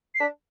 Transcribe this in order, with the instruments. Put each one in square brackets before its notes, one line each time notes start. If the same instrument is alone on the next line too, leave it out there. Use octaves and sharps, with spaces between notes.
[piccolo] C7
[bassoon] D4 [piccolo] B6